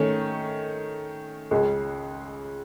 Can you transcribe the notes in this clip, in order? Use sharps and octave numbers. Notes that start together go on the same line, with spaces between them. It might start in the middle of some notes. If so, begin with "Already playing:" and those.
Already playing: D#3 A3 C#4
C#2 C#3 G#3